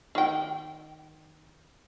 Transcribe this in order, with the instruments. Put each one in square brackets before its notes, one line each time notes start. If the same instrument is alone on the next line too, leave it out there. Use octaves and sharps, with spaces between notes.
[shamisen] D#3 G5